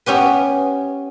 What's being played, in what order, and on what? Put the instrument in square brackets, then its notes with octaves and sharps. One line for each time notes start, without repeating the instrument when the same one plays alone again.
[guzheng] B3 C#4 G4 B4